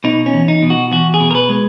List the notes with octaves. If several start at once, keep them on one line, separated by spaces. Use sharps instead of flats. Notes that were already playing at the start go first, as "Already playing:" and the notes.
B2 D#4
C#4
E2
D#4
B2
F#4
E2 F#4
G#4
B2
A#4
B4
G#3